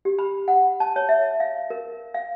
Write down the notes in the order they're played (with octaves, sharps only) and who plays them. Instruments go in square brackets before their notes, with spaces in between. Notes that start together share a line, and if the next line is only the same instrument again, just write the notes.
[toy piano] G4
B5
F#5
A5
C#5
E5
F5
A#4
F5